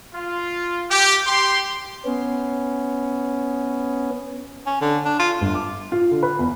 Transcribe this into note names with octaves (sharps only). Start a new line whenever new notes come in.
F4
G4
G4 C6
B3 C#4
C#4
D3
D4
F4
G1
D6
F4
D3
B4
E2